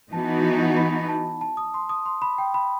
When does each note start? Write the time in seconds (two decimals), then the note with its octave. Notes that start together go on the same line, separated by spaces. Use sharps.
0.12 E3 B3 D#4 F#4 A5
0.77 B5
1.09 A5
1.41 A5
1.57 D#6
1.74 C6
1.89 D#6
2.06 C6
2.22 B5
2.38 G5
2.54 B5